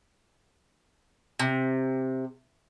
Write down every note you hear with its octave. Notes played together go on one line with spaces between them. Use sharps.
C3